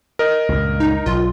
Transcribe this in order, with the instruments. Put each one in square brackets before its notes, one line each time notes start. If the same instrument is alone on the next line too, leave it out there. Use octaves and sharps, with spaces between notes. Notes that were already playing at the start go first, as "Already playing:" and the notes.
[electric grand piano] A#4 D#5
[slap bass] C#2 G2 A#2
[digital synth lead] D#4
[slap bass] B1 F#3 [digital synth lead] F4